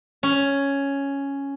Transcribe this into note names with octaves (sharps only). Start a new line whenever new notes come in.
C#4